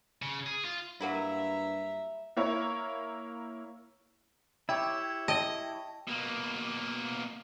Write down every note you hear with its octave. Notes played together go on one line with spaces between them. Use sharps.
C#3
G#4
F4
G2 F#3 A#3 E4 E5 A#5
A#3 E4 C#5
E4 G4 C#5 E5 G5
D#5 G5 A5
B2 A#3